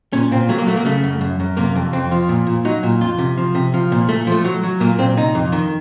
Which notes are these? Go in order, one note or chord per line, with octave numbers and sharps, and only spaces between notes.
A#2 C#4
A#2 C4
F#3 A3
A#3
F#3 A3
A#3
C#3 A3
F#2
F#2
F#2
C3 A#3
F2
F2 C4
F3
A#2
A#2
F#3 D#4
A#2
F2 F4
C3
F3
C3
F3
A#2
A#2 A3
F3 A3
F#3
F#3
A#2 A#3
A#2 C4
C3 D#4
F2
D#3